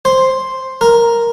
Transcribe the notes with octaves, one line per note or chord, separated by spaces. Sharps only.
C5
A#4